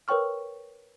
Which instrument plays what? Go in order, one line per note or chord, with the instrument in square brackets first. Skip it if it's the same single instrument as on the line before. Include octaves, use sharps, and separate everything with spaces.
[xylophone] A#4 B4 C#5 G5 C#6 F6